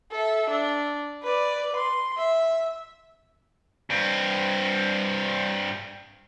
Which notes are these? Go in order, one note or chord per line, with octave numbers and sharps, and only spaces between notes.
A4 E5
D4
B4 D5
C6
E5
G2 C4